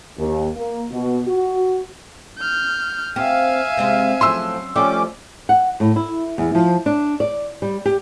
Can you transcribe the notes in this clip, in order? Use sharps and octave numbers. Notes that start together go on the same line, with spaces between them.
D#2
A#3
B2
F#4
F6 G6
C4 G4 E5 F5 G#5
C3 G#3 C4
A2 F3 F#3 C#4 G#4 C6 E6
F3 G3 A3 C#4 D6
F#5
A2
E4
E2
F3
D4
D5
G3
G4